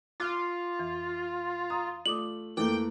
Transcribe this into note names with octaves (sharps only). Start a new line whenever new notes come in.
F4 D6 F6 F#6
F2 E3
A#5 D#6
A3 F4 D5 D6 D#6 F#7
F2 E3 A3 A#3 A4 G5 D6